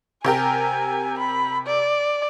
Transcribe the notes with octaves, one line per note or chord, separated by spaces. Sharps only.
C3 G4 A#4 G#5
B5
D5